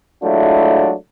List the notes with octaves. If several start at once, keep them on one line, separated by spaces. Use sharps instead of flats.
F#3 G#3 A3 D4 E4 F4